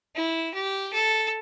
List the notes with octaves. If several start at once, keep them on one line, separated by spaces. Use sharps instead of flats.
E4
G4
A4